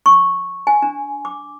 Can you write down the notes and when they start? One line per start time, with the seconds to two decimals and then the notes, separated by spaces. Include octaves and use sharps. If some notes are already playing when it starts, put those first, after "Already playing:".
0.06 C#6
0.67 G#5
0.82 D4
1.25 D6